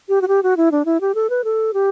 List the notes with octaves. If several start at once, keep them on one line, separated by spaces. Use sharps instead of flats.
G4
F#4
G4
F#4
E4
D4
E4
G4
A4
B4
A4
G4